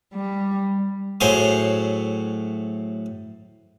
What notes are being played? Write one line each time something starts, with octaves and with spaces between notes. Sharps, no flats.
G3
A2 F#3 G#4 C5 C#5